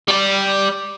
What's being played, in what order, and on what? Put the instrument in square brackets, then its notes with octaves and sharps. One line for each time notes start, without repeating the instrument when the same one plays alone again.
[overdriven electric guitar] G3 D5